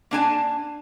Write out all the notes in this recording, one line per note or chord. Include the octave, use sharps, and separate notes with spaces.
A#3 D4 G#5 A5